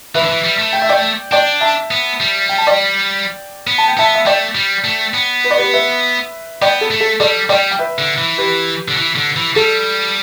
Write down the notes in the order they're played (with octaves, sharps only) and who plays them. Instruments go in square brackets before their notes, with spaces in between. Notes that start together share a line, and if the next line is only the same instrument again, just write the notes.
[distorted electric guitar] E3 [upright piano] B4 E5
[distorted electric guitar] D3
E3
G3
A3
[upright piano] G5
E5
D5 G5
[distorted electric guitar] D4 [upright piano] D5 G5
[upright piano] E5 A5
[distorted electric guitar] B3
G3
[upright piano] G5
A5
D5 G5
[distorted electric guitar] B3
[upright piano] A5
G5
[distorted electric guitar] B3 [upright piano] E5 A5
[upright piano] E5
[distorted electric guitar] A3 [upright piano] D5 G5
[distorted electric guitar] G3
A3
B3
[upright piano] B4
D5
G4 B4
B4 E5
[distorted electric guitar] B3 [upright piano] D5 G5
[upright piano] A4
[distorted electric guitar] A3
[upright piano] A4
[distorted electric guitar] G3 [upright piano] A4 D5
[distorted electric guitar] G3 [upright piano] D5 G5
[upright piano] G5
B4 E5
[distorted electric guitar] D3
E3
[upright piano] G4 B4
[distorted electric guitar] D3
E3
D3
E3
[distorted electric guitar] G3 [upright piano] A4